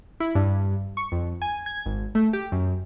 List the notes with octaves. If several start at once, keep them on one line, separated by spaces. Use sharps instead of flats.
E4
G2
C#6
F2
G#5
G#6
G#1
A3
G4
F#2